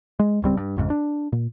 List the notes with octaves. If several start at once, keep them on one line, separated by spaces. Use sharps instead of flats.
G#3
D1 C#2 G3 C4
G2
A1 F2 G#2 C#3
D4
A#2